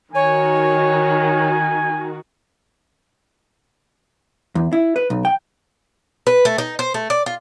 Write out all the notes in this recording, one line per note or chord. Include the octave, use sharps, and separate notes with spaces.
D#3 F#4 C#5 G#5
E2
E4
B4
B1
G5
B4
A3
D#4
C5
A3
D5
F4